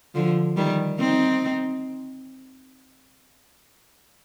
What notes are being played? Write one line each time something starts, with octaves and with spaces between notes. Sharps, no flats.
D3 F3
D#3 G3
C4 D#4